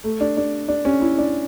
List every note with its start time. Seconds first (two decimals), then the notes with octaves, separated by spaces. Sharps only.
0.04 A3
0.20 D4
0.37 D4
0.68 D4
0.85 C#4
1.01 E4
1.18 D4